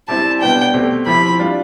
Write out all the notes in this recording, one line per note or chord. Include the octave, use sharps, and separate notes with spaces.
G3 C4 E4 G4 A5
B2 G3 B3 D4 G5
B2 A3 C4 G4
F3 C4 E4 G4 B5
G3 D4 F4